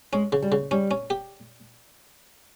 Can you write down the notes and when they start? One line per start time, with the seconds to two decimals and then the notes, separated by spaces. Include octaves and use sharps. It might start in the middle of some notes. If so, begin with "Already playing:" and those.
0.13 G#3 C#4
0.32 C#3
0.42 G3
0.52 C#3
0.71 G3 C#4
0.91 C#4
1.10 G4